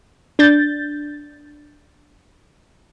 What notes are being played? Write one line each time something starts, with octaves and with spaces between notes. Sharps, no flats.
D4 G6 A6